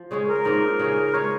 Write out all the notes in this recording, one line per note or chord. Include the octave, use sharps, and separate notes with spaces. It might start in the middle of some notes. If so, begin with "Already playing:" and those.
Already playing: F3
C#3 G#3 C#4 G#4
A#4
G#2 F3 A#3 D#4
C#3 A#3 C#4 G#4
C#3 G#3 C#4 C#5